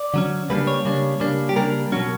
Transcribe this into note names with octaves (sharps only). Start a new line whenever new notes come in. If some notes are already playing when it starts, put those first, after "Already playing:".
Already playing: D5
D3 F#3 C#4
C#3 G3 A#3 D4 B4
C#5
C#3 G3 A#3 D4
C#3 G3 A#3 D4
G4
C#3 G3 A#3 D4 A#4
B2 F#3 C#4 F#4